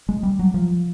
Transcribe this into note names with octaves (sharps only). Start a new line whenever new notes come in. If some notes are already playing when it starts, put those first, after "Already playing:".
G#3
G3
F#3
F3